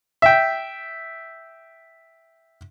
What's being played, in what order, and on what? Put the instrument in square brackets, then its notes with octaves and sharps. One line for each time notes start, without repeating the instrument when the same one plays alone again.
[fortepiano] E5 G5